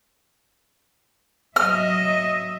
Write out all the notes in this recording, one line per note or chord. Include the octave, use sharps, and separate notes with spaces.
F#3 D#5 E5 F6